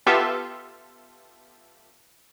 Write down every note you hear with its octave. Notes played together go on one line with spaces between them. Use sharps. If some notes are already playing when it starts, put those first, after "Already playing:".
B3 F4 G4 A4 E5